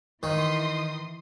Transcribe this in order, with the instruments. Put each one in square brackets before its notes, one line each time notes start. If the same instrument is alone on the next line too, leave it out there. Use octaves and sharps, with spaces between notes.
[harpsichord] D#3 [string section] E3 C6 D#6